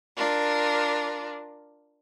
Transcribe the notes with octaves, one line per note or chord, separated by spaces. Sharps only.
D4 F4 A#4